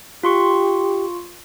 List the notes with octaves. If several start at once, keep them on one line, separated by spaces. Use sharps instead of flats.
F4 G4 C6 C#6